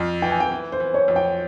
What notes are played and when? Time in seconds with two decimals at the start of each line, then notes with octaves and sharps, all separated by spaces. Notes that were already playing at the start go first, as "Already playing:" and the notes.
Already playing: F2
0.22 E3 G5
0.31 G#5
0.40 G5
0.52 E3
0.72 C5
0.80 E3
0.94 C#5
1.08 F2
1.16 G5